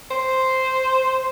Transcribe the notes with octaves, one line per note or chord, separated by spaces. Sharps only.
C5